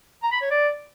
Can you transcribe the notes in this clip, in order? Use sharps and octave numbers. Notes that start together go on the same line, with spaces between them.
A#5
B5
C#5
D5